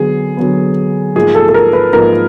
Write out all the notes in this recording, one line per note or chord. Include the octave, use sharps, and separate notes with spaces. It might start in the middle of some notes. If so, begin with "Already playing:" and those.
Already playing: D3 F#3 B3 G#4
D3 F#3 B3
G#2 F3 A#3 G#4
A4
A4
A#4
B4
G#2 F3 A#3 A#4